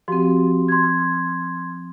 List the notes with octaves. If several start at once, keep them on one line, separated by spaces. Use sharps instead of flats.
F3 C4 F#4 G4 C6
C6 G#6